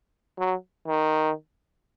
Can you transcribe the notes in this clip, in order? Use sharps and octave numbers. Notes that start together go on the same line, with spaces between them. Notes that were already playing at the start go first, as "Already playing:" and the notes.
F#3
D#3